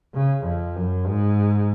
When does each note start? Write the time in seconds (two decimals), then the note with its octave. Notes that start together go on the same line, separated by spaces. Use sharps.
0.14 C#3
0.45 F2
0.76 F#2
1.07 G#2